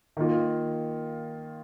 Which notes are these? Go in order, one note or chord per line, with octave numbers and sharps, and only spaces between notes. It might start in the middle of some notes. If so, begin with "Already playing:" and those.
D#3 A#3 F4